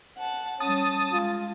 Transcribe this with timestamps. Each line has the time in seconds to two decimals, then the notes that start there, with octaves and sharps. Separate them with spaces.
0.17 F#5 A5
0.60 G3 C#4 A5 D#6
1.13 G#3 F4